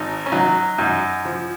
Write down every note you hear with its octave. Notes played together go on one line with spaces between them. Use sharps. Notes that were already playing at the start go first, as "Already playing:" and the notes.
Already playing: G#1 D#4
C#4
F#3 D#4
F#2 D#4
F3